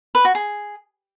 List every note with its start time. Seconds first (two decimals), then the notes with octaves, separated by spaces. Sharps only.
0.15 B4
0.25 F#4
0.35 G#4